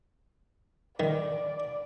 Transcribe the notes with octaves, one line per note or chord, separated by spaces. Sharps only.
D#3 D5